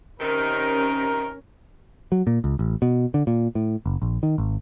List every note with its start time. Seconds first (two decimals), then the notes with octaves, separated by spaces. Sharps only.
0.20 C3 D#3 C#4 A#4
2.12 F#3
2.27 A#2
2.44 C#2
2.59 A1
2.82 B2
3.14 D3
3.27 A#2
3.55 A2
3.86 F#1
4.02 A#1
4.23 D#3
4.38 G#1